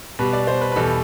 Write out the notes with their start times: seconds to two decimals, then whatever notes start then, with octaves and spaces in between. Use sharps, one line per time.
0.19 B2 G3 B4
0.33 D5
0.47 C5
0.61 B4
0.72 B4
0.76 E2 B2 G3 A4